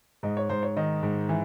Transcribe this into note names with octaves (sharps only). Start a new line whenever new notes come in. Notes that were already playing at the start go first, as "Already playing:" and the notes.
G#2 D#5
C#5
G#2 C5
C#5
D#3 D#5
G#2
E3